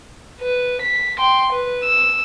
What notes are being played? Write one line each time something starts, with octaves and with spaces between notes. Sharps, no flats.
B4
B6
G5 C6
B4
E6